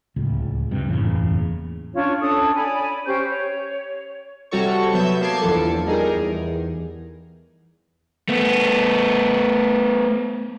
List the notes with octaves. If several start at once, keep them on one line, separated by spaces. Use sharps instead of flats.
D1 C#2
G2 C3
F#1 E2 A2 C#3
C#4 D4 F4 C#5
C#4 D4 A4 D#6
C#5 D5 G#5 B5
C#4 G4 C5 G6
C#5
C3 G3 F#4 A4 C#5 C#6
F#3 B3 E5 G6 E7
A#3 B3 A5 D6 G#6 C7
G1 E2 F3 A4
G3 D#4 G#4 A#4
E2
A3 B3